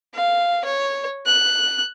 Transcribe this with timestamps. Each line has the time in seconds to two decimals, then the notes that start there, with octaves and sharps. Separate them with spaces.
0.14 F5
0.64 C#5
1.26 F#6